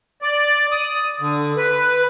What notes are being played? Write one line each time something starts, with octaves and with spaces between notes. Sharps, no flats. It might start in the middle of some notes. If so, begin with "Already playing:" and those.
D5
D#6
D3
B4